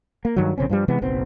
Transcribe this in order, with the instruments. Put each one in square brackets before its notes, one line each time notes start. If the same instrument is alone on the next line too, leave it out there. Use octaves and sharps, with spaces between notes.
[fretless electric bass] A#3
G2 D#3 F#3
A#1 C#3 C4 C#4
G2 F3 G3
C3 E3 G#3 B3
F#1 B1 B3 C4